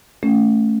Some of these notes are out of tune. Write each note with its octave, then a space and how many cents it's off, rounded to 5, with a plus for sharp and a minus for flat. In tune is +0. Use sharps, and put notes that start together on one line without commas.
A3 +0 C#4 +0